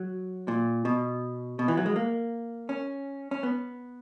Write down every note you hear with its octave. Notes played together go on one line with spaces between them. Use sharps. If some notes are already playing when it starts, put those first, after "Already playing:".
Already playing: F#3
A#2
B2
B2
E3
F#3
G#3
A#3
C#4
C#4
B3